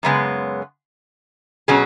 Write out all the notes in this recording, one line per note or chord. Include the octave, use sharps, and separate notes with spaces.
F#2 C#3 G#3 B3
B2 F#3 C#4 G#4